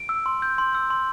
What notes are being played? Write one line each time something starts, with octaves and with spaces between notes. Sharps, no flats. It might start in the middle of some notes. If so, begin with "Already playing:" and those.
Already playing: D7
E6
C6
G6
C6
E6
C6